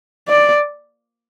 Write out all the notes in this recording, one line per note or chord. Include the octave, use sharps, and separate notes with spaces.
D5